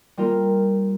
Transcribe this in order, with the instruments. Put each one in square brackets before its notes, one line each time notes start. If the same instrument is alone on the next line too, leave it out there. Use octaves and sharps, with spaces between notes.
[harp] G3 A#3 F4 A#4